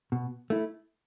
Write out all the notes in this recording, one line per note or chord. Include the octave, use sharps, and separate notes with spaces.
B2
A3 E4